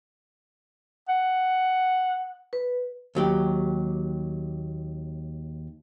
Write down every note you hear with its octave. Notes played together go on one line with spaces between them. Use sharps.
F#5
B4
D#2 F#3 G4